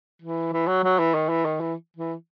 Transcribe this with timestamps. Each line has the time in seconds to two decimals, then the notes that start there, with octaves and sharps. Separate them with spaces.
0.22 E3
0.53 E3
0.67 F#3
0.84 F#3
0.99 E3
1.14 D#3
1.29 E3
1.45 D#3
1.60 E3
1.97 E3